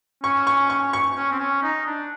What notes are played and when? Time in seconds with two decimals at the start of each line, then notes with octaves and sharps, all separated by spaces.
0.23 C#4 C#6
0.47 C#6
0.70 C#6
0.93 C#6
1.17 C#4
1.31 C4
1.39 C#4
1.63 D#4
1.86 D4